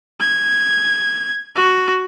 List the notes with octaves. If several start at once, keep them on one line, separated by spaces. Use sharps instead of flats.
G#6
F#4